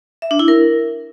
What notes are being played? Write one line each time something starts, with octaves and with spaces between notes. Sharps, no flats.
E5
D4
E4
A#4